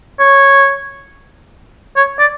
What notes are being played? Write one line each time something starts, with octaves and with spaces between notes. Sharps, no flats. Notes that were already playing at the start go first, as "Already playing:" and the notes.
C#5
C#5
D5